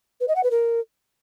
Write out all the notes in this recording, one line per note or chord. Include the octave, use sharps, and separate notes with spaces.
B4
D#5
F#5
B4
A#4